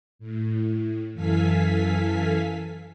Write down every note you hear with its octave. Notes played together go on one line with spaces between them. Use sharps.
A2
F#2 E3 A4 F5 G#5 B6